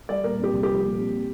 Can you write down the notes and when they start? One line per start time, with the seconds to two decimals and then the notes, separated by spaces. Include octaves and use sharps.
0.09 G3 D5
0.24 A#2 A#4
0.39 C4 G4
0.53 C2
0.63 G4
0.69 F3
0.84 A#2
0.98 C4